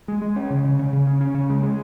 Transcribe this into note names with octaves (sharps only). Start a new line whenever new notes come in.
G#3
G#3
C#4
C#3
C#3
C#3
C#3
C#4
C#4
C#3
G#3
G#3